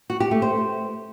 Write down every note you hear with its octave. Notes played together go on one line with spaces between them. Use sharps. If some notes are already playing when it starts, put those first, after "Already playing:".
F#4
G4
A3
C5